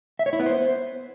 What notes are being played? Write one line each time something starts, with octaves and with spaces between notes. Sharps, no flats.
E5
C#5
E4
B3
C5